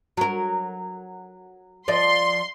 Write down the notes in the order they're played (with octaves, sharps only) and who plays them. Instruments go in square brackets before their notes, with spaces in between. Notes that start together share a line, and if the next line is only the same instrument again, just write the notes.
[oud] F#3 A#4
[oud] F3 D5 D#5 [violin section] C6